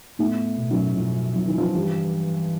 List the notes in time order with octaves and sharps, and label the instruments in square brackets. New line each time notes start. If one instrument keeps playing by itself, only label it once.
[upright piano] A2 A3 [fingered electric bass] B3
[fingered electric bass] B2
[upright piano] F#2 F#3
[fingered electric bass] B2 [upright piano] F3
[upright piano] F3 [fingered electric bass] F#3
[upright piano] E3
F3
[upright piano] G2 G3 [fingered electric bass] E3